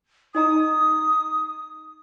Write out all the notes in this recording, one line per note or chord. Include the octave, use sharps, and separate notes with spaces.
D#4 D#5 A#5 D#6